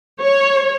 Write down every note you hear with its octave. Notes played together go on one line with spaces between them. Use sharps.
C#5